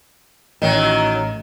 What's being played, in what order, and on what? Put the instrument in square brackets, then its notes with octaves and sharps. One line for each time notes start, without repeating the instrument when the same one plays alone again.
[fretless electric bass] A1 [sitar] D#3 F#3